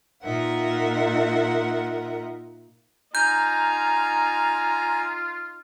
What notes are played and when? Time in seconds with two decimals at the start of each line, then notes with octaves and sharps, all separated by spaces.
0.22 A#2 D#4 F4 A#4 E5 F#5
3.15 D#4 F4 G#5 A#5 G6